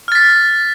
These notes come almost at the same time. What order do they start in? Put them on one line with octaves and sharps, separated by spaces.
F6 A6 B6